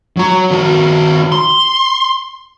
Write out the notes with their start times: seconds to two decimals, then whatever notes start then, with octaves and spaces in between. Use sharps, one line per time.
0.17 F#3 F#4
0.51 D#3 F#4
1.32 C6